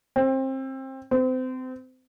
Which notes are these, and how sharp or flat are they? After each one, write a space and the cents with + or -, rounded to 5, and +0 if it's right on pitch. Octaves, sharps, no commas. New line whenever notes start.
C4 +25
C4 -30